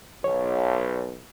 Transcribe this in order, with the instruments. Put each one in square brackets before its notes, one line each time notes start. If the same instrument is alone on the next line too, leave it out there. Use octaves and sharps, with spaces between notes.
[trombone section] B1 [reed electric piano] C#5